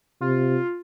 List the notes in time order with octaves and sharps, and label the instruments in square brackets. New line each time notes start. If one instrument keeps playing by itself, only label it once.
[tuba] C3 [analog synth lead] F4